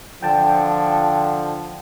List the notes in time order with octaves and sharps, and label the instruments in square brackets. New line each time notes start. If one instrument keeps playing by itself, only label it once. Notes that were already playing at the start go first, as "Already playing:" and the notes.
[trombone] D3 [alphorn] F3 [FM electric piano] G5 A5